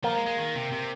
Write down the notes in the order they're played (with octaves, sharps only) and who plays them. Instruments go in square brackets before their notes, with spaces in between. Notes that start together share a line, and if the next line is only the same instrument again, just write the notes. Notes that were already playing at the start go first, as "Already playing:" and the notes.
[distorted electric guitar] F3 [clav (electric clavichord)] A#3
[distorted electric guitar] G#3
G#3
D#3
C3
C3